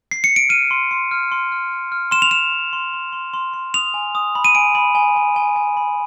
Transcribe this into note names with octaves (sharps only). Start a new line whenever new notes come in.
C7
C#7
D7
F6 D#7
C6
C6
F6
C6
F6
F6
F6
C6 E7
F7
C6 E7
C6
C6
C6
C6
C6
C6
D#6 F7
G#5
D#6
B5
D#7
G#5 D7
B5
G#5
G#5
G#5
G#5
B5